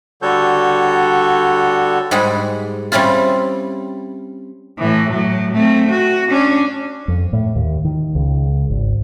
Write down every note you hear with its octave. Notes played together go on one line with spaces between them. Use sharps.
D3 G3 F#4 A4 C#5 G6
G#2 G3 G#3 G#4 F#5 B5
G3 C4 C#4 E4 F4
A2 E3
A2 F#3
A3 C4
F#4
C#4 D4
F2
A2
D#2
D#3
C#2
G#1